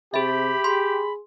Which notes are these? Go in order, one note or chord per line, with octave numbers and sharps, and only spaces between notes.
C3 G4 G#4 E5 B5
G#4 C6